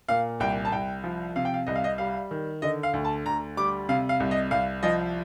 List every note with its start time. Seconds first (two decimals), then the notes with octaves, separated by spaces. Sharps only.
0.09 A#2 F5
0.40 C2 G5
0.65 A5
0.72 C2 G5
1.04 F3
1.36 C3 F5
1.45 G5
1.54 F5
1.67 C2 D#5
1.76 F5
1.84 D#5
1.98 G3 F5
2.31 D#3
2.62 D3 D#5
2.83 F5
2.93 D2
3.05 A5
3.26 D2 A#5
3.57 G3 D6
3.89 C3 F5
4.09 F5
4.20 C2
4.31 D#5
4.51 C2 F5
4.83 F3 D#5